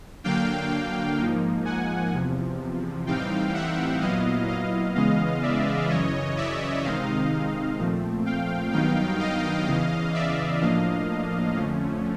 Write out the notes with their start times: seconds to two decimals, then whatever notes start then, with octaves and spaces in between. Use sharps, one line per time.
0.24 D3 F#3 A#3 D4 F5 G5
1.18 G#2 F3 A#3 D#4
1.65 F#5 G#5
2.13 E2 C3 F3
3.06 A2 E3 G3 C4 D#4 F5 G5
3.54 E5 F#5
4.01 A#2 F#3 B3 E4 D#5 F5
4.48 D#5 F5
4.95 C#3 E3 G#3 B3 D#5 F5
5.42 D5 E5
5.90 F#2 C#3 E3 C#5 D#5
6.37 D5 E5
6.84 C3 D#3 G#3 C4 D#4 D#5 F5
7.79 A#2 F3 A3 C4
8.26 F5 G5
8.72 G2 D#3 F#3 B3 D#4 F5 G5
9.20 D#5 F5
9.67 E2 C#3 E3
10.14 D5 E5
10.61 A2 F3 A#3 D4 D#5 F5
11.56 F2 D3 F3 A3 C#4